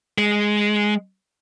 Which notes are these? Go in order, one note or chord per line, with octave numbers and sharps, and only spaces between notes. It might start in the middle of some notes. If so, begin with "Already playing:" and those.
G#3